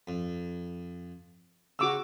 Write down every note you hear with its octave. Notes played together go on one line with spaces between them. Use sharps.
F2
C#3 F#4 D6 E6